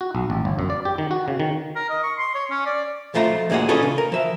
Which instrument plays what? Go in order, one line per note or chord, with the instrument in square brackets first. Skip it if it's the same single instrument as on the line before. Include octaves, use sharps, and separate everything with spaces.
[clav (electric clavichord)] F#4
B1
A1
G1
F#2
D5
G4
D#3
F#4
C#3
D#3
[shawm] A#4
D#5
C#6
C6
C#5
C#4
D5
[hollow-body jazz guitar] B1 F3 A3 F4 A#5
D2 A#2 G#3 G#4 F#5
C#4 D4 F4 G#4 A4 B4
C#3
A#4
F3 E5